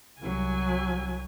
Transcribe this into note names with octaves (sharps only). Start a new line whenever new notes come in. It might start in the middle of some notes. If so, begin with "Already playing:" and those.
C2 F#3 G#5